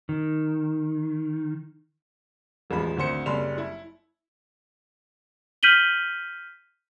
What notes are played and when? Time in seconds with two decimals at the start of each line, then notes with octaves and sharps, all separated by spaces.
0.09 D#3
2.70 E1 A1 F3 G#3 B5
2.97 G#1 D2 C5 C#7
3.26 F#1 G3 B5 C6 F7
3.58 E4
5.63 F6 G6 B6 D#7 F#7 G7